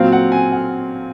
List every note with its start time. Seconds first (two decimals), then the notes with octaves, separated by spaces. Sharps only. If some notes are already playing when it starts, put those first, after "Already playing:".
Already playing: A#2 F#3 C4 F5
0.12 F#5
0.32 G#5
0.52 F#5